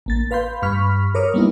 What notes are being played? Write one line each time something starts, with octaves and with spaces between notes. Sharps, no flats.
A1 A#3 A6
B4 F5 B5 C6 G6
G2 B5 C#6 F6 B6
A#4 C#5 D6 D#6 F6
G3 A#3 B3 D#4 E4